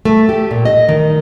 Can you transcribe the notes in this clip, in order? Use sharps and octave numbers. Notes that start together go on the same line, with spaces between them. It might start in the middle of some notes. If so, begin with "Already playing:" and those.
A3
G4
A#2
D#5
D#3